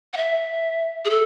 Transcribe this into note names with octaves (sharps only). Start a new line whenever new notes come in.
F#5
E5
G#4
A4